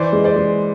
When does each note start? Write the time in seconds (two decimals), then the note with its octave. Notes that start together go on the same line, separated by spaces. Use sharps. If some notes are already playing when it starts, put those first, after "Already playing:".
Already playing: E3 C5 D5
0.13 G#3
0.24 C5 D5
0.36 G#3